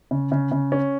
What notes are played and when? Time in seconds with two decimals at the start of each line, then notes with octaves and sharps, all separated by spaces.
0.11 C#3
0.32 C#3
0.52 C#3
0.72 C#4